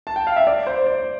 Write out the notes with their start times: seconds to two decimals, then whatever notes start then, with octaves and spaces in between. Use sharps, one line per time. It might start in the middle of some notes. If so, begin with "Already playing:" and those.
0.07 A5
0.16 G5
0.27 F5
0.36 E5
0.47 D5
0.67 C5
0.87 D5